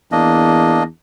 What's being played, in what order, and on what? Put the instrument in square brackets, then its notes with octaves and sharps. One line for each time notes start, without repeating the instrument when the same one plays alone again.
[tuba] E2 [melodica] A#3 D4 D#5